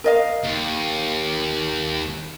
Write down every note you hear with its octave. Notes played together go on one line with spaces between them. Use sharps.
A#4 D#5 F5
D#2